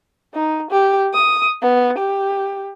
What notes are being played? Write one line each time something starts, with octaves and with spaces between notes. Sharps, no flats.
D#4
G4
D#6
B3
G4